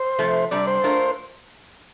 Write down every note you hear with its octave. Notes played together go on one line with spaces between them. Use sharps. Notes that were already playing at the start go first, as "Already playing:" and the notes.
Already playing: C5
C3 F3 A3
C3 G3 D4 G4 D5
C5
A3 D4 F4 A#4